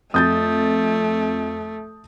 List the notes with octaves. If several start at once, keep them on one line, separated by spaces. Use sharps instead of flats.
F2 A3 D#6 G6 A6